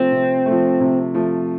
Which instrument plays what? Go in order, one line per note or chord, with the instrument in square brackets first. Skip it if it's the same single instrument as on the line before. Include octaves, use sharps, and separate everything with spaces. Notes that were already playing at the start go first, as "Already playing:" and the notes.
Already playing: [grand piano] C3 F3 A3 [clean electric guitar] C4
[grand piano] C3
A3
F3
C3
F3 A3